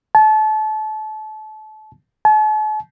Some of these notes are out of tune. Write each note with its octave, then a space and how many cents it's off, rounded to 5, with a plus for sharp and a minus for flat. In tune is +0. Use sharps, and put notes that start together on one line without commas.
A5 -30
A5 -45